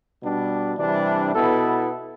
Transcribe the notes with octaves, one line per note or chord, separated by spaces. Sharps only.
B2 G3 D4
C3 E3 G3 D4
B2 B3 E4 A4